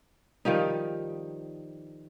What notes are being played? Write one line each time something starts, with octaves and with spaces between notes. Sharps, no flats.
D#3 F3 G3 D#4